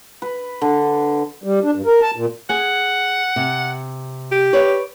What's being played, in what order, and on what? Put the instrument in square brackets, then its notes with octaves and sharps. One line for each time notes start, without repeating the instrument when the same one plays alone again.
[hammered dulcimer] B4
D3
[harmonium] G3
D4
G2
A#4
A5
A#2
[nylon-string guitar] G#4 G#5 [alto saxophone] F#5
[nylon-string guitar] C3
[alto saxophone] G4
[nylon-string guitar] B4 C#5 D5